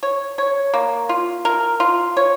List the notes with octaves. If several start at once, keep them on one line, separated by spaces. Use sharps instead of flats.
C#5
C#5
A#3
F4
A#4
F4
C#5